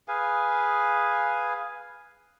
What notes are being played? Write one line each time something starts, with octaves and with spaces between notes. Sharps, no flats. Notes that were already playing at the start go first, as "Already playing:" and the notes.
G#4 B4 F5 G#5